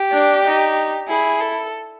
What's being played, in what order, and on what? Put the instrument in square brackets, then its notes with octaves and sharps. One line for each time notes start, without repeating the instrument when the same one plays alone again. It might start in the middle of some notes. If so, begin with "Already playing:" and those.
Already playing: [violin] G4
[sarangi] D4
D#4
[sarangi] E4 [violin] G#4
[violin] A4